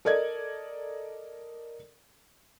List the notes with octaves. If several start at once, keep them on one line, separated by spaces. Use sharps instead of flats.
A4 A#4 D5 D#5 G#6